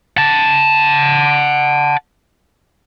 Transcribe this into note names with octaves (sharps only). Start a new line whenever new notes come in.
F#5 A5